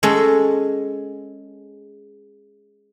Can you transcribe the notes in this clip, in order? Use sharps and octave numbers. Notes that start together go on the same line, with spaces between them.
G#3 C#4 A4